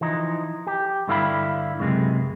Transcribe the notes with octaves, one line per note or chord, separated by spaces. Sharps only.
E3 F3 D#4
G4
G2 D3 E4 G4 F5 B5
C#2 F#2 C3 G#3